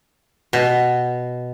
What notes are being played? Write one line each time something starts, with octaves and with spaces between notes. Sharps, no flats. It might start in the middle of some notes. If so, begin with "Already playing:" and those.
B2